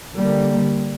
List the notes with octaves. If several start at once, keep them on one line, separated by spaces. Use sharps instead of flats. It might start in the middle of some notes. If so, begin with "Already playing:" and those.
D3 G3 A#3